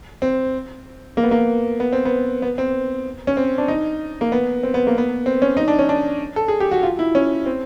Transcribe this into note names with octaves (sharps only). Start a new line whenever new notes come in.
C4
A#3
B3
A#3
B3
C4
B3
B3
C4
C#4
C4
D4
D#4
A#3
B3
C4
B3
A#3
B3
C4
C#4
D#4
D4
C#4
D4
A4
G#4
G4
F#4
F4
E4
C#4
C4